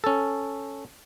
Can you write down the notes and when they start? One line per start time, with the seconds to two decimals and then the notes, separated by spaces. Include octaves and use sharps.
0.04 C#4 A4